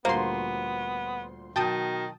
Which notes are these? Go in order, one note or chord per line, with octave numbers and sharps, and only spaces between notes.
D2 A#2 G3 A#3 B3 C5 C6
B2 D#3 F#3 G5 A5 D#6